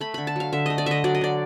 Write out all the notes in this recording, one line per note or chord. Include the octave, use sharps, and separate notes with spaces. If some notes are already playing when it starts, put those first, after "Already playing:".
A3 B5
D3 B5
A5
F#3 F5
D3 E5
A3 D#5
D5
D3 D#5 E5
F#3 D5
D#5
D3 D5